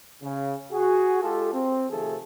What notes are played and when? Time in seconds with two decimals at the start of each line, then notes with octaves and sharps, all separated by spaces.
0.22 C#3
0.71 F#4 G#4
1.22 G#3 F4 G4 A4
1.53 C4
1.90 C3 D#3 F3 A3 G#4 A4